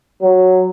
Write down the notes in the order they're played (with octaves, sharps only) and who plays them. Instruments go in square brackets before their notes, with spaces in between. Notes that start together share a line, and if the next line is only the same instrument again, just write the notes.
[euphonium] F#3